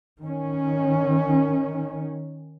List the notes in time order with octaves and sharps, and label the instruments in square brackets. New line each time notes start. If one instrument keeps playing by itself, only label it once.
[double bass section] D#3 C#4